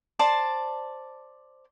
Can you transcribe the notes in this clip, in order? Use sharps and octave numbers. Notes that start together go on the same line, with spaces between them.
C5 D5 A5